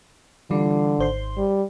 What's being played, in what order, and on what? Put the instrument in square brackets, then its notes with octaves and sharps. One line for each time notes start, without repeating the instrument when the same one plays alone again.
[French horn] D3 [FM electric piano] E3 G3 F4
[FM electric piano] G#1 C5 C6
[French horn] G3